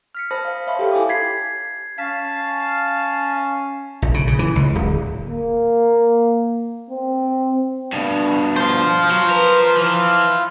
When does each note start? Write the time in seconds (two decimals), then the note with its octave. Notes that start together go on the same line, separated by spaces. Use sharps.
0.15 F6 B6 C#7
0.31 C5 A5 B5 D#6 A#6
0.45 F5
0.67 C#5 E5 F5 A5 B5 C6
0.79 G4 A4 G5
0.91 E4 G#5 D6 D#6
1.09 G#6 B6 C7
1.98 C#4 F5 A5 B6
4.02 A#1
4.14 C#3
4.27 C#3
4.39 E3
4.56 C#2
4.75 D1
5.25 A#3
6.90 C4
7.93 G2 B2 D4
8.56 F4 C5
9.11 F#3
9.30 A#4 B4
9.77 E3 F3